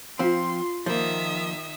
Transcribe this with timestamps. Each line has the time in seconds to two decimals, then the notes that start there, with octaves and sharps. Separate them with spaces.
0.19 F3 C4 F4 F5 C6
0.86 D#3 F3 A#3 E5 D#6